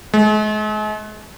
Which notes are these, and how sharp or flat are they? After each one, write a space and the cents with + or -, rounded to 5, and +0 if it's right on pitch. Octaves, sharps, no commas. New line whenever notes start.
G#3 +40